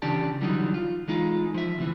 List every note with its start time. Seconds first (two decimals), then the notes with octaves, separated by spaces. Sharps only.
0.02 C#3 E3 D4 G4 D5 A5
0.41 D3 E3 F#3 G3 C4 D#4
0.74 F4
1.08 E3 G#3 D#4 F4
1.54 F3 E5
1.78 D2 C3 E3